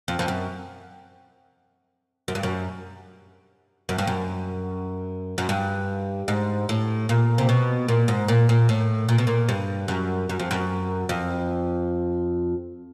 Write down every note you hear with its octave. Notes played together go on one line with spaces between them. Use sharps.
F2
F2
F#2
F#2
G2
F#2
F#2
G2
F#2
F#2
G2
G#2
A2
A#2
C3
B2
A#2
G#2
A#2
A#2
A2
A#2
B2
A#2
G2
F#2
F#2
F2
F#2
F2